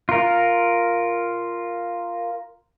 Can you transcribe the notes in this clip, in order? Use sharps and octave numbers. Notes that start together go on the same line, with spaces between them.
F4 A#4